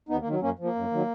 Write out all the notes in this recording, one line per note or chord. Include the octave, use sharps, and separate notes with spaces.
D#2 B3 D#4
A#3
D#3 F#3
F#2 A#3 C#4
F3
A#3
F#2
D#3 F#3